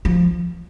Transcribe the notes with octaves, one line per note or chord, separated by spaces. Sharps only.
F3